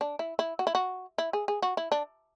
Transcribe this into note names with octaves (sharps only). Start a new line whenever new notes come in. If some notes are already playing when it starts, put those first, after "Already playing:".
D4
E4
E4
F#4
E4
F#4
E4
G#4
G#4
F#4
E4
D4